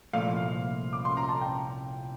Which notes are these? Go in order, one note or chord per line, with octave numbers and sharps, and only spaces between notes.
C2 A#2 F3 A3 F5
D6
C6
A#5
A5
G5